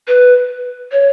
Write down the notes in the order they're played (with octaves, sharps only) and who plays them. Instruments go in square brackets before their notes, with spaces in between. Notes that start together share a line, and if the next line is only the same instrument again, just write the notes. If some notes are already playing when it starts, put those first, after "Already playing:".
[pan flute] B4
C#5